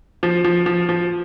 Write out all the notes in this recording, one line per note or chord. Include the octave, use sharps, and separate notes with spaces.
F3
F3
F3
F3